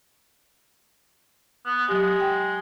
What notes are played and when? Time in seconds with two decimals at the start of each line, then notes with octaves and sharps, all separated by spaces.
1.65 B3
1.88 F#3 G#3 G4
2.20 G5